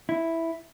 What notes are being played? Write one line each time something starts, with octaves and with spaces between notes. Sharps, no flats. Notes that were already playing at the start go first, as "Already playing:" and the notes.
E4